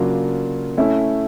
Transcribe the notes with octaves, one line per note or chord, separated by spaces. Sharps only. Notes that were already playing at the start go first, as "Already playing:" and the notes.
Already playing: C#3 F#3 A#3 D4 F4
A3 C#4 E4